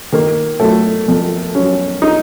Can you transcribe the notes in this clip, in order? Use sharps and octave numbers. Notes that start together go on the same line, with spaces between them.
D#3 A#3
F#3 A3
F2
F#3 C#4
D#4